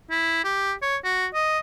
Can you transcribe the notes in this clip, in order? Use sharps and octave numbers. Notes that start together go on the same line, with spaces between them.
E4
G4
C#5
F#4
D#5